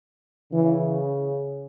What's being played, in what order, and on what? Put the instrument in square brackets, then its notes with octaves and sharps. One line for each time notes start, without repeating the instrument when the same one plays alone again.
[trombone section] C#3 [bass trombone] E3